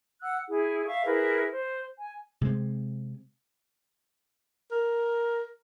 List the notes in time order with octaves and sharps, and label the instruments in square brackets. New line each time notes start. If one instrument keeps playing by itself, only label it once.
[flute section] F#5 E6 F#6
E4 G#4
E5 F5 C#6
E4 G#4 A#4 B4
C5
G#5
[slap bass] C3 G#3 C4
[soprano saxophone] A#4